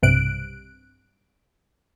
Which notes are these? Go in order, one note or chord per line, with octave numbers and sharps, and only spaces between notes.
B1 G2 C3 F#6 D7